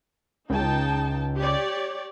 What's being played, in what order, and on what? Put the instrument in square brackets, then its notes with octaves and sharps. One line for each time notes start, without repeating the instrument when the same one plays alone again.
[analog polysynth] C#2 [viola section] D#4 G5 A5
[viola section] G4 C#5 D5